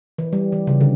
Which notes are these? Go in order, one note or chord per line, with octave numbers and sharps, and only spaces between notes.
E3
G3
E3
C#3
D3